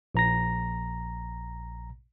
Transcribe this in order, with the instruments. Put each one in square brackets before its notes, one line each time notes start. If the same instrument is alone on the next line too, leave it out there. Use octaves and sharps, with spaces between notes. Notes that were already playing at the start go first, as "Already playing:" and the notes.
[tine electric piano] A#1 A#5 A#6